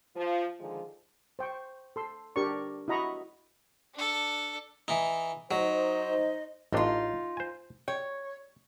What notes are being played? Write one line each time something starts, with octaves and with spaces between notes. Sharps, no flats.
F3
D3 D#3 F3 G#3
C5 G5 C#6
A4 C6 E6
D4 G4 A#4 D5 C#6
E4 F#4 D#5 A#5 B5 C#6
D4 A4
E3 D#4
F#3 D#4 C5 D#5
A1 A2 D4 D#4 F4
C5 G#5
C#5 G5